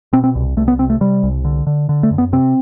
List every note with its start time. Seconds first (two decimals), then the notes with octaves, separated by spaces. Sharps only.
0.13 B2 C4
0.24 C4
0.35 C2
0.57 C2 A3
0.68 B3
0.79 C3 C4
0.90 A3
1.01 C3 G3
1.23 C2
1.45 D3
1.67 D3
1.89 D3
2.03 A3
2.11 F#2
2.18 B3
2.33 C3 C4